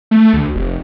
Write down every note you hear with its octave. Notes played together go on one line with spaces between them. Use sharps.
A3
D2
F1